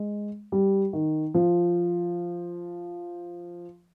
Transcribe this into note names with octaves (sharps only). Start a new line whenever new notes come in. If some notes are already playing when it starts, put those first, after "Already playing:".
Already playing: G#3
G3
D#3
F3